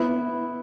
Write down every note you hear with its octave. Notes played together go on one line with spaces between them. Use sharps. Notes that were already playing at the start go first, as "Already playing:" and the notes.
Already playing: B3 E4